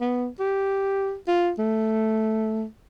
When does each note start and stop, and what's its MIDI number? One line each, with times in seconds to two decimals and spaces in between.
0.01 0.27 59
0.40 1.15 67
1.28 1.51 65
1.58 2.65 57